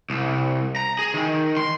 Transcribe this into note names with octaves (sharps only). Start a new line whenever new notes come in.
C2
A#5
G#4
D#3
C6